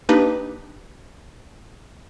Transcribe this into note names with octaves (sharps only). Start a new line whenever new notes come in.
A#3 D4 D#4 G4 B4